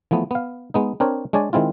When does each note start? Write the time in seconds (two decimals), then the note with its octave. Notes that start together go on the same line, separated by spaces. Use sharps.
0.11 E3 F3 A3 B3
0.31 B3 F5
0.74 G#3 B3 D#4
1.00 C4 D4 A#4 C5 C#5
1.33 G#3 D4 C#5 D5 G#5
1.53 D#3 G#3 C4 E4 F4